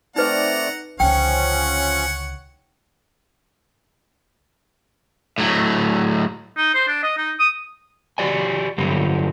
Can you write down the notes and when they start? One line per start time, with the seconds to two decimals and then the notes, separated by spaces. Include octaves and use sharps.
0.16 A3 C4 D#4 B4 D5 D#5 F#5 A#5
1.00 C#2 D3 F3 C#4 C#5 F#5 G5
5.38 A2 F#3
6.57 D#4
6.75 C5
6.88 D4
7.03 D#5
7.18 D#4
7.39 D#6
8.18 F#4 G4 D5 G#5
8.78 G2 D3 F#3 G3